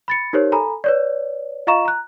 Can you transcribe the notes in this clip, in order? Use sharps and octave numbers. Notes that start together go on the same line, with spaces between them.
B5 A6 C#7
D#4 G4 A#4 C5 C#5
A4 G#5 A#5 B5
B4 C#5 D5
F4 D#5 F5 A#5 C#6 E7
A#5 F#6